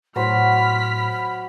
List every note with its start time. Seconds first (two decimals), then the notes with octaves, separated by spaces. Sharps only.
0.16 A2 F#3 C5 B5 E6 F6 B6